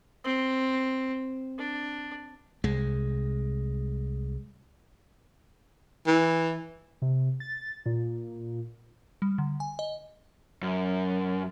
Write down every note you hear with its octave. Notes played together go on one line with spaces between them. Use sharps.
C4
D4
C2 G#3
E3
C3
A6
A#2
G3
D3
G#5
D#5
F#2